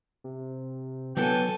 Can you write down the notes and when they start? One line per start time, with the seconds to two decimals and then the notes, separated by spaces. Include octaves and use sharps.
0.24 C3
1.17 D3 E3 F#3 B3 A4 G5 G#5